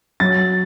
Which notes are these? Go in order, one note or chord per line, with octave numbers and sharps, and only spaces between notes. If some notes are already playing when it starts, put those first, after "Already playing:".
F#3 A6